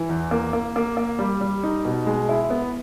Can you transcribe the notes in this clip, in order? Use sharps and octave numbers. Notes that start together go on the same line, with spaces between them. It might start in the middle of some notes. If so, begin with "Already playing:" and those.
Already playing: E3
E2
A#3
A#3
A#3
A#3
G3
G3
D#4
B2
G#3
E4
B3